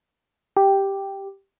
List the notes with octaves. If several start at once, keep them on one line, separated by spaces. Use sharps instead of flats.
G4